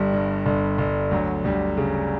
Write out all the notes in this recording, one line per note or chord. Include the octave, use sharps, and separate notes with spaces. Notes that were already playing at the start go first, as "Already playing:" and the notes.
Already playing: G1 G3
G2
G1
G1
D2 F#3
D2 G3
C#3